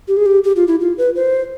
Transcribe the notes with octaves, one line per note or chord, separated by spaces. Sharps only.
G4
G#4
G4
G4
F4
E4
F4
B4
C5